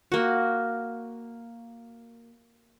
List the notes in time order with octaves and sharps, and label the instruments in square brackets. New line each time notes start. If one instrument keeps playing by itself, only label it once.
[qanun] A#3 F#4